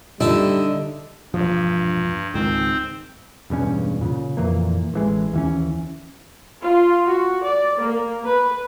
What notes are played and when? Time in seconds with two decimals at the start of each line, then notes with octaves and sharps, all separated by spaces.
0.20 A#2 D3 G3 D#4 E4
1.34 E1 A#1 G2 F3
2.34 C#2 G#2 D#3 C4 C5
3.50 E1 E2 G2 C#4
4.01 A#2 C#3
4.37 F2 A#2 E3 A#3
4.94 A1 E3 G#3
5.33 D#2 E3 C#4
6.61 F4
7.06 F#4
7.43 D5
7.79 A#3
8.25 B4